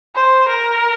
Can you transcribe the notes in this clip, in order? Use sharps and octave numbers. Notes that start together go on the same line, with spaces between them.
C5
A#4